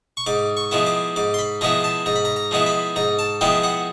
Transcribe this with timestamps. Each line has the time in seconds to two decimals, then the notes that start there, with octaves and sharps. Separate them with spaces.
0.17 C#6
0.26 G#2 D6
0.57 C#6
0.71 F3 G#3 B3 E4
0.86 D6
1.16 G#2 D6
1.34 C6
1.39 B5
1.61 F3 G#3 B3 E4 A#5
1.84 A5
2.06 G#2 A#5
2.16 B5
2.25 A#5
2.36 A#5
2.51 F3 G#3 B3 E4
2.66 B5
2.96 G#2 A#5
3.19 A5
3.41 F3 G#3 B3 E4 G5
3.63 F#5